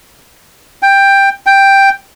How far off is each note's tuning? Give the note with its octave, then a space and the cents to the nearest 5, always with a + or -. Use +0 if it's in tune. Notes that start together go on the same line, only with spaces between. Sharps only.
G5 +10
G5 +5